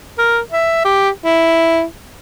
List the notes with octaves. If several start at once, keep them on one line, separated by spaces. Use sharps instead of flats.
A#4
E5
G4
E4